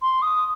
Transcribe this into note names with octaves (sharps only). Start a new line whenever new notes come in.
C6
D#6